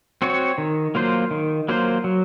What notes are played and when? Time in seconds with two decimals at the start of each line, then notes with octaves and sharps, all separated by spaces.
0.22 C4 F#4 C#5
0.58 D#3
0.95 F#3 A#3 F4 C5
1.31 D#3
1.69 F#3 A#3 F4 C5
2.04 F#3